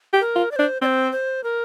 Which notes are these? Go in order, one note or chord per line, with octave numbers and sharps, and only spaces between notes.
G4
A#4
F4
D5
D4 C5
C4 C5 D5
C5
A#4